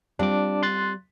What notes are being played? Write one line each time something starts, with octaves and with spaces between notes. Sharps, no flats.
G3 C4 D4 F4 D6
C6 F#6 A6